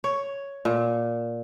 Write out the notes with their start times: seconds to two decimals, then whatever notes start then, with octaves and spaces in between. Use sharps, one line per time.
0.04 C#5
0.65 A#2